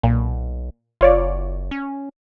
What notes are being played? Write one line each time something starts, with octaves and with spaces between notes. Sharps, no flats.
B1 A#2
F#1 F4 C#5 D5
C#4